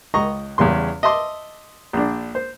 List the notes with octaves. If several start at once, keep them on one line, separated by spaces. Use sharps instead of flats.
C#2 D#5 A#5 C#6
E2 C#3 G3 C6
D#5 E5 A5 C6 D6
A#1 D4
C5